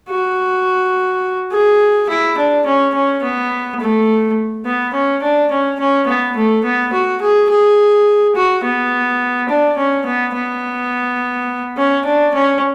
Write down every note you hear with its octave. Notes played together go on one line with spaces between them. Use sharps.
F#4
G#4
E4
D4
C#4
C#4
B3
A3
B3
C#4
D4
C#4
C#4
B3
A3
B3
F#4
G#4
G#4
F#4
B3
D4
C#4
B3
B3
C#4
D4
C#4